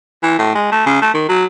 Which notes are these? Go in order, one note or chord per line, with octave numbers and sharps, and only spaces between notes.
E3
A2
G#3
A3
C#3
A3
D#3
F#3